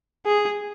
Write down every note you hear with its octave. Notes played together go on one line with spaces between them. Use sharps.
G#4